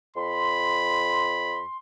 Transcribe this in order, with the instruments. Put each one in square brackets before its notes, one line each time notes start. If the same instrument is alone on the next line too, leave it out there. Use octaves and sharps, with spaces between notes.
[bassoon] F2 [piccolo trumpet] B5 [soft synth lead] C6